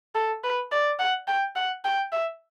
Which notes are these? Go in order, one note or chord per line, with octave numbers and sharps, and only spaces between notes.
A4
B4
D5
F#5
G5
F#5
G5
E5